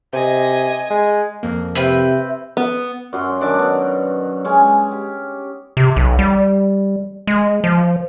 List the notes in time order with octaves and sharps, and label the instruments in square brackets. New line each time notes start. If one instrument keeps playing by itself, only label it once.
[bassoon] C3 [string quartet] D#5 G#5
[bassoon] G#3
[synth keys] F2 A#3
[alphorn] C3 [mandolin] C4 B4 G5 [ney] E5
[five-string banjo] B3
[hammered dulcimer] F#2 F#3 C6
D#3 D4 E5 D6
B2 D#4
G#3 C#4 G#5
G4
[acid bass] C3
B1
G3
G#3
F3